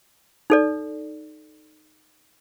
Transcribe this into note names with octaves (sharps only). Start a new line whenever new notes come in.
D#4 A4 D5